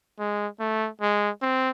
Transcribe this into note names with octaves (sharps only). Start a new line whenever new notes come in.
G#3
A3
G#3
C4